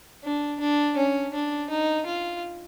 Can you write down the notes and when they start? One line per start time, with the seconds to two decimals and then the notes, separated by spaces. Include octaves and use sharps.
0.24 D4
0.60 D4
0.97 C#4
1.34 D4
1.70 D#4
2.06 F4